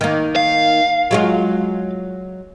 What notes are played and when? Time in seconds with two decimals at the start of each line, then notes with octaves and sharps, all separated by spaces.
0.01 D#3 A#3
0.36 F5
1.11 F#3 G#3 F4